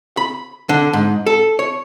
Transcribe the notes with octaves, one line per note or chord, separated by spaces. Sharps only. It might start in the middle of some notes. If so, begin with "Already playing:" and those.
B5
D3
G#2
A4
C#5